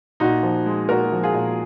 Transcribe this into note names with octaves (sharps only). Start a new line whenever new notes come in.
A#2 D#4 F#4
F3
G#3
A#2 F#4 A#4
F3
F4 G#4
A#2